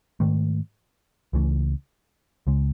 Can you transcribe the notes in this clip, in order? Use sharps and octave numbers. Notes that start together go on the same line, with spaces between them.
G#2 D#3 A3
C#2 C#3 E3 A3
C#2 C#3 G#3